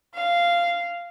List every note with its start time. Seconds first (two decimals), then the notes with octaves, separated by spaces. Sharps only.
0.14 F5